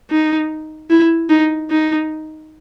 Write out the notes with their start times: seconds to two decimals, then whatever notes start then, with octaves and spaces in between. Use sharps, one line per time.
0.11 D#4
0.90 E4
1.30 D#4
1.70 D#4